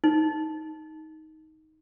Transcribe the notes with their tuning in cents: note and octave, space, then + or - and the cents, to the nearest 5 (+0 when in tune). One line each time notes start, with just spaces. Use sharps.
D#4 +10